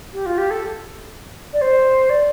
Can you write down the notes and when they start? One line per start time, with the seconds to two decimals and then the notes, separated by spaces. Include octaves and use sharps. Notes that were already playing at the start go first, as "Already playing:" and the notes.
0.13 G4
0.26 F4
0.38 G4
0.50 A4
1.53 D5
1.61 C5
2.10 D5